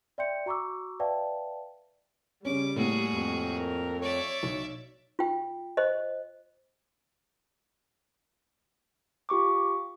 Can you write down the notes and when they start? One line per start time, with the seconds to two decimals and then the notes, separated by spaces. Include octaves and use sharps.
0.18 D5 E5 G5 C6 G6 C#7
0.46 F#4 A#5 C#6 D6 E6
1.00 B4 D5 E5 F5 G5 A5
2.45 C#3 G3 C#4 D6
2.76 A2 A3 A#3 F#4 G#4
3.12 F2
3.57 A#4
4.02 C#5 D5 E5
4.43 B1
5.19 F4 G5
5.77 C5 D#5
9.29 F4 G4 C#6 D6